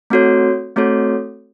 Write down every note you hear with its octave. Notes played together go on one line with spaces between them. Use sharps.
A3 C4 F#4 A4 C#5
A3 C4 F#4 A4 C#5